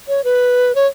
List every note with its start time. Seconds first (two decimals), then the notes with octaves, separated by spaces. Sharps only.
0.08 C#5
0.24 B4
0.75 C#5